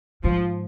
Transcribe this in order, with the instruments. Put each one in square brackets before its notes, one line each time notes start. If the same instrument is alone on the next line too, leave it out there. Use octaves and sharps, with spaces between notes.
[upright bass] G#2 [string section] F3